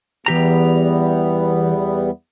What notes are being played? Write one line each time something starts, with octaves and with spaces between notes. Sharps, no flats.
E2 E3 G3 B3 G4 A#5